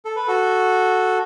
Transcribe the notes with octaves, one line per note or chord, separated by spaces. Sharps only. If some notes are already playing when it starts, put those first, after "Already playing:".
A4
B4
F#4 A4